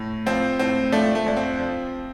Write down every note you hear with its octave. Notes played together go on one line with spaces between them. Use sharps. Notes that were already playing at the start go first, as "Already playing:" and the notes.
Already playing: A2
F3 C4
A2 C4
F3 A3 D4
A3
F2 D4
C4
F3